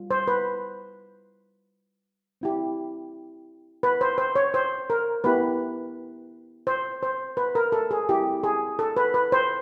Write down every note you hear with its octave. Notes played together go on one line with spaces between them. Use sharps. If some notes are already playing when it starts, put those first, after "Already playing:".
Already playing: G3 F4
C5
B4
C4 E4 G4
B4
C5
C5
C#5
C5
A#4
B3 E4 G4 B4
C5
C5
B4
A#4
A4
G#4
C4 E4 G4
G#4
A4
B4
B4
C5